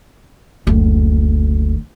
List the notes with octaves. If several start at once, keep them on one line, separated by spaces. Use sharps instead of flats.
F#1 D2